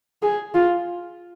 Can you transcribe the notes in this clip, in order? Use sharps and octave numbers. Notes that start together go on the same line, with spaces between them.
G#4
F4